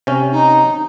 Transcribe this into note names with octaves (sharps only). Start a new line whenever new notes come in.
C3 C#4
D#4